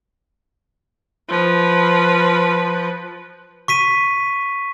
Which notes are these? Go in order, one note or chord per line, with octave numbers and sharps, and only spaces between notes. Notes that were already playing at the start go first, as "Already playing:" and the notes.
F3 B4
C#6 B6 D#7